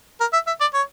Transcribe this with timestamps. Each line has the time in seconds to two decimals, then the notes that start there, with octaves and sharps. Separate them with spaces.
0.21 A#4
0.33 E5
0.47 E5
0.61 D5
0.74 C#5